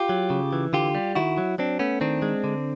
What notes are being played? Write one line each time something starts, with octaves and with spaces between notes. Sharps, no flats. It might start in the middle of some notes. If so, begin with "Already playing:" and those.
Already playing: F4 G4
F#3
C#3
E3
D3 F4 G4
G3
D#3 E4 F#4
F#3
F#3 C4 D4
A3 B3 C#4
D#3 C4 D4
G#3
D3